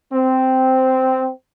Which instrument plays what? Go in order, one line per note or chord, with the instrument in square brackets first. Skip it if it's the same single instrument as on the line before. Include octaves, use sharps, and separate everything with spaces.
[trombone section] C4